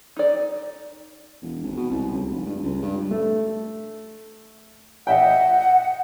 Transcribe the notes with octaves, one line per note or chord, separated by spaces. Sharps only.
D#4 D5
E1
G#1
B2
C2
C#2
F1
G2
C#2
G2
A3
D#5 E5 F#5 G5